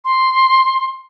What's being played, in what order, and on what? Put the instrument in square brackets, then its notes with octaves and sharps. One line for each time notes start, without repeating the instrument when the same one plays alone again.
[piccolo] C6